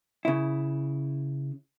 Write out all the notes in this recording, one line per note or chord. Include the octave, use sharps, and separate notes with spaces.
C#3 E4